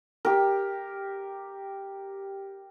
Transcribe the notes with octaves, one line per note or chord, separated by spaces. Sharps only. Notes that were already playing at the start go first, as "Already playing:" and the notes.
G4 A#4